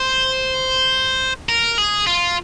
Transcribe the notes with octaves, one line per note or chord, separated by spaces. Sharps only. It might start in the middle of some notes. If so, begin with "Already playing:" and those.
Already playing: C5
A#4
G#4
F4